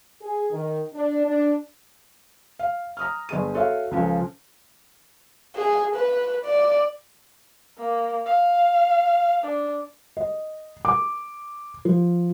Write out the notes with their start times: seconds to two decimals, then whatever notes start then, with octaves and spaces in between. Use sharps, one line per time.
0.21 G#4
0.51 D#3
0.93 D4
1.26 D4
2.59 F5
2.97 A#5 D#6 F6
3.29 G1 G#4 D#7
3.54 F#4 A4 C#5 E5 F5
3.91 C#2 C#3 F3 C#4 A4
5.56 G#4
5.95 B4
6.46 D5
7.78 A#3
8.26 F5
9.44 D4
10.17 D#5
10.85 D6
11.85 F3